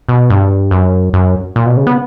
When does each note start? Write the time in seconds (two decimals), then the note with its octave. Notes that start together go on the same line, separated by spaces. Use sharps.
0.09 B2
0.30 G2
0.71 F#2
1.13 F#2
1.56 A#2
1.66 B2
1.77 C#3
1.87 B3